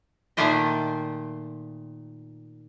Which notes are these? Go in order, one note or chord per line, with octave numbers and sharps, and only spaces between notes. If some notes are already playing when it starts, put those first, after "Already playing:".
A#2 D#3 A3 F4 G4 D#5